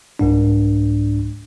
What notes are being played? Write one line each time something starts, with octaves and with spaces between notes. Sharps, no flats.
C2 G#2 D4